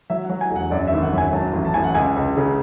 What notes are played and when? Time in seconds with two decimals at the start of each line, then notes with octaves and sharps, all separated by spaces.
0.10 F#3 E5
0.25 F#5
0.29 F#3
0.41 G#5
0.51 E1
0.56 F#5
0.71 F#2 D5
0.87 E5
0.92 G#1
1.03 F#5
1.13 F#2
1.18 G#5
1.33 F#3 A5
1.53 A1
1.65 A5
1.74 A1 G#5
1.84 F#5
1.95 C#2 G#5
2.16 C#2
2.37 C#3